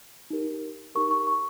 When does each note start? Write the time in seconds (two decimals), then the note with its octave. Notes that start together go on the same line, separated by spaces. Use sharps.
0.30 D#4 G4 A#4
0.95 D#4 G4 A#4 C#6
1.11 C#6
1.27 C#6